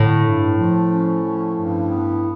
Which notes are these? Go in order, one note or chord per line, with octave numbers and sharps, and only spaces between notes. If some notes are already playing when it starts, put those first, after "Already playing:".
Already playing: A2 D3
G2
F3
C#4
F3
G2
B3